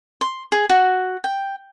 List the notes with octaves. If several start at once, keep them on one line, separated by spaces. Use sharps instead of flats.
C6
G#4
F#4
G5